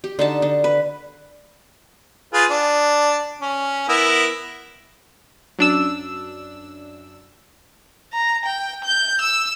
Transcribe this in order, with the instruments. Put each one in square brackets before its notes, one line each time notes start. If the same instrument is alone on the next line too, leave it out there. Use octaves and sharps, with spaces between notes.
[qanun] G4
D3 D#4 A5
D3
B4
[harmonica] F4 G#4 B4
D4
C#4
B3 E4 A#4
[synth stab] F#2 D4 E6
[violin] A#5
G5
G6
E6